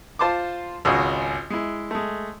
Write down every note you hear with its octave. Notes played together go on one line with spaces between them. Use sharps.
F4 C5 A5 C6 D6
G#1 C#2 F#4 D#5
G#3 E4
G#3 A3